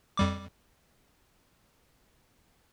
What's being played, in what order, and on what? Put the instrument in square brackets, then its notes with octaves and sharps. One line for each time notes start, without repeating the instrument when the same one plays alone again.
[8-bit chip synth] F2 G3 D6